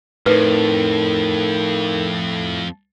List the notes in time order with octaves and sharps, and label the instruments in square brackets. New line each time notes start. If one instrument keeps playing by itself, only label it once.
[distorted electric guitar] F2 [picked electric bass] A2 [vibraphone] D#4 A#4 [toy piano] B4